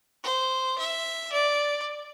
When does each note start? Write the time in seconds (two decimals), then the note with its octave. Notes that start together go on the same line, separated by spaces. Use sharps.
0.24 C5
0.79 E5
1.32 D5